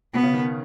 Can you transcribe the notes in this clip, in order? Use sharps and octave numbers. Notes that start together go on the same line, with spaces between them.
B2 B3
C#3
D#3